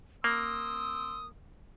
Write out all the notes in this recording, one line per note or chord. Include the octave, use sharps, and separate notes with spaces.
A#3 C6 D#6 E6